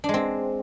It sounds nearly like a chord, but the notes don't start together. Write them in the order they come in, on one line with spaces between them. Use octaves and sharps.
D4 G#3 C4